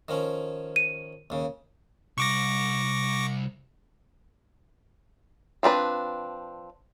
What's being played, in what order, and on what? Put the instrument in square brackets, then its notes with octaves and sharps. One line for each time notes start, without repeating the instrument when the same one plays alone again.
[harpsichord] D#3 F3 C#4
[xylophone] D#7
[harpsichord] D#2 C#3
[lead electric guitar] C2 [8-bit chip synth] C#6 D6 A#6
[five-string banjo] F3 C4 D4 B4